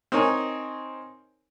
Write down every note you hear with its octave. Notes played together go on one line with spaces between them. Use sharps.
C4 D#4 A#4 C#5 G#5